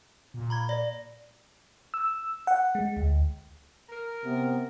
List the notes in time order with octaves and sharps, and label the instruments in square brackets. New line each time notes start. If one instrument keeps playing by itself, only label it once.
[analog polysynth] A#2
[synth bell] A#5 B5 G#6
D5 A#6
[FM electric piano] E6
F#5
G#3
D2
[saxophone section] A#4
[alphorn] C3 [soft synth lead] B3